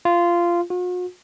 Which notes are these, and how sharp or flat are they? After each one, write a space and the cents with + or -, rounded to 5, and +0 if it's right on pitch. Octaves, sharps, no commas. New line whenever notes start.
F4 -15
F#4 -45